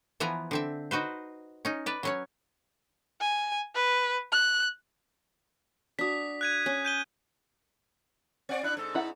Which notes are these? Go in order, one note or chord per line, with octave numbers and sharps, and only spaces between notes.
E3 F3 B3 G#5 A#5
D3 C4 E5
D#4 F#4 B4 C5
C#4 D#4
B4 D5
F#3 C#4 C#5
G#5
B4
F#6
D4 F#4 D#6 B6
F#6 G#6 D#7
C#4
G6 D#7 G7
C4 D5 F#5
D4 E4 F#6
G#2 A4
D#4 E4 F#5